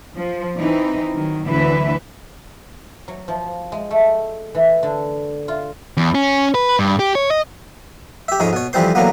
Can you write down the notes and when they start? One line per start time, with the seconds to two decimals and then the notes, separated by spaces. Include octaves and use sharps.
0.17 F3
0.58 E3 C4 D#4
1.14 D#3 F#3
1.48 D2 D3 E3 F#3 B4 E5
3.08 F#3
3.28 F3
3.72 G#3
3.91 A3
4.55 E3
4.83 D3
5.48 F4
5.97 E2
6.15 C#4
6.55 B4
6.79 G2
6.99 G4
7.15 C#5
7.31 D#5
8.28 G4 E5
8.40 F2 G#2 G#3 C#5
8.53 B2 C#5
8.73 F2 E3 G3 C4 C5 C6
8.95 D3 E3 F#3 A#3 B3